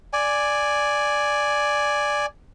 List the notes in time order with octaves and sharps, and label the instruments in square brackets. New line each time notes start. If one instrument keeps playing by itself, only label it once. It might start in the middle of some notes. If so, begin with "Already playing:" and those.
[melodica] D5 G#5